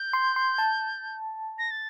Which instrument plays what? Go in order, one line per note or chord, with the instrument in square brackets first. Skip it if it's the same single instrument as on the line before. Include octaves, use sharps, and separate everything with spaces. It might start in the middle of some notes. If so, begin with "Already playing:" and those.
Already playing: [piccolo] G6
[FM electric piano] C6
C6
A5
[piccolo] A#6
A6